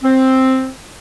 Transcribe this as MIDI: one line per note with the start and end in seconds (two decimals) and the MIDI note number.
0.03 0.68 60